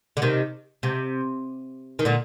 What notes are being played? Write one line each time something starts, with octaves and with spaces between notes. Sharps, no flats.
D3
C3 D#3
C3
D#3
A#2 D3